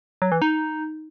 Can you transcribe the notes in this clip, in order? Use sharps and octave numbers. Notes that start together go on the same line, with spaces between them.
F#3
E3
D#4